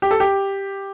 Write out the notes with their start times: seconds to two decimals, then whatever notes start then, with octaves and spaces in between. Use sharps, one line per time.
0.02 G4
0.11 A4
0.20 G4